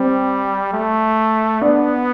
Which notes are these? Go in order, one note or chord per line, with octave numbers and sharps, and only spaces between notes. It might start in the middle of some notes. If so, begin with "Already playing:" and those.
Already playing: G3 C4
A3
B3 D4